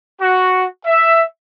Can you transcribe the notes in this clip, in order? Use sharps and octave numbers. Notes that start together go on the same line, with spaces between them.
F#4
E5